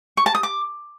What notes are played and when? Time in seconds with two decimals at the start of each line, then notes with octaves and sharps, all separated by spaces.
0.17 C#6
0.26 A5
0.35 D#6
0.43 D6